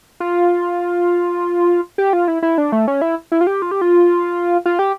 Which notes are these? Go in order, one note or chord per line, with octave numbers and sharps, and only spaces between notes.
F4
G4
F4
E4
E4
D4
A3
C#4
E4
E4
F4
G4
F4
G4
F4
F4
G4